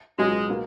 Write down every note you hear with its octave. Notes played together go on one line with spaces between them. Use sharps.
C#2 B2 F#3 G#3
B2 A#3